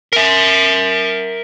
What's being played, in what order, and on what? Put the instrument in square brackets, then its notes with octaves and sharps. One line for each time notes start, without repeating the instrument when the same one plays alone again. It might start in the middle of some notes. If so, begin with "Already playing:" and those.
[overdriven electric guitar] A#4 E5